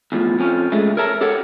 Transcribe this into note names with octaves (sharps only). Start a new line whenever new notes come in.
E2 A2 F3
F2 F3 C#4
C#3 G#3 A3
A#4 C#5 E5 A5 A#5
G4 A4 A#4 C#5 F#5